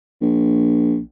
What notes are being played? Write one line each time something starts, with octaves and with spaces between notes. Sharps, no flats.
A#1